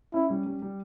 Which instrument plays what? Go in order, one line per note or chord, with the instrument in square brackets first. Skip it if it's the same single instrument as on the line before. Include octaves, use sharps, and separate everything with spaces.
[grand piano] C#4 [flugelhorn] E4
[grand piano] G3
G3
G3